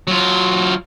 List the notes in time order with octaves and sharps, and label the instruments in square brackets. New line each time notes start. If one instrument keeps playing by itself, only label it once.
[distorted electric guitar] F#3 F4